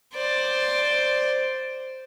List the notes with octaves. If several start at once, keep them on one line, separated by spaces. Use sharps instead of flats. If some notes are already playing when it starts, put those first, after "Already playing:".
C5 D5